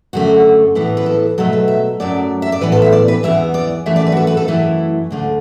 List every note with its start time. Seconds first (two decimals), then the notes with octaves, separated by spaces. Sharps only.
0.13 F#2 D3 A3 F#4
0.75 A2 E3 B3
0.97 B4
1.06 A4
1.38 B2 F#3 A3 A4
1.53 B4
1.68 E5
2.00 F#2 F#3 A3 D5
2.42 E5
2.52 D5
2.61 A2 E3 B3 B4
2.72 A4
2.82 E5
2.92 D5
3.08 B4
3.23 E2 E3 B3 E5
3.54 D5
3.86 F#2 E3 A3 E5
3.96 D5
4.07 B4
4.12 F#4
4.17 A4
4.27 B4
4.37 A4
4.48 F#2 E3 A3 E4
5.10 D2 D3 A3